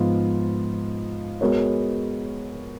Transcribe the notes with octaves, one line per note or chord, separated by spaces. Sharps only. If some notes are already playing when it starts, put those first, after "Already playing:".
Already playing: G#2 F3 B3 F4
G#3 B3 F#4 A#4 C#5